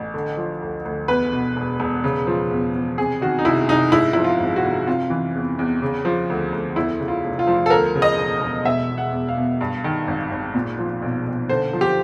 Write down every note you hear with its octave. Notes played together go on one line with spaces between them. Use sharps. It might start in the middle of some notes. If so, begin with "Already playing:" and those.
Already playing: A1
D3
F3
D2
D2
E2 B4
B2
E1
E1
C#3
F3
E2
E2
C3 G#4
D#3 F#4
D#4
C2 E4
C2 D#4
G#2 E4
F3 E4
F4
G#1
F#4
G#1
C3 F4
E3
E2
E2
C#3
F3
D2
D2
E2 E4
C#3
F4
F1
F4
F3
A4
D2 A#4
C#3
D#5
E1
E1
B2 E5
E2
F#5
E2
F5
B2
G2
D#3
G#1
G#1
A#2
F3
B1
B1
D3 C5
F3
G4